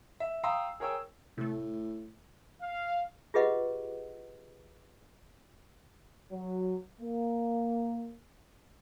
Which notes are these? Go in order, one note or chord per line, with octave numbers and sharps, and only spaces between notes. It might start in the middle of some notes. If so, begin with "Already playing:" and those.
E5
F5 G5 A#5 C6 D#6 E6
G#4 A#4 C#5 G5 E6
A2 C3 A3
F5
F4 G4 G#4 B4 D#5 F#5
F#3
A#3